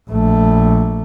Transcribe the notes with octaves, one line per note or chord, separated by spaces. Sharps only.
A#1 A3